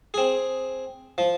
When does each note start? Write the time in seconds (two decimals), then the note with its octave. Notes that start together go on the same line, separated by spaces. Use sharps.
0.14 C4 G#4
1.18 F3